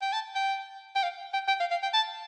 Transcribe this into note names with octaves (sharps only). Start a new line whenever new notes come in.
G5
A5
G5
G5
F5
G5
G5
F5
F5
G5
A5